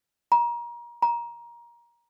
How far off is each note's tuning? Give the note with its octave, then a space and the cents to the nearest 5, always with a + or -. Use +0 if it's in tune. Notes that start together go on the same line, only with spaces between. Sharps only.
A#5 +30
A#5 +20